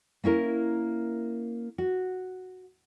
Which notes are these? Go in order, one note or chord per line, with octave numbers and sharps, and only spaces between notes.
A#3 C#4 E4 A#4
F#4